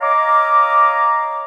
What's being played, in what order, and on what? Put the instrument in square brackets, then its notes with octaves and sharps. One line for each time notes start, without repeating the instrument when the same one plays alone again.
[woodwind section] C#5 D#5 F5 A#5 D6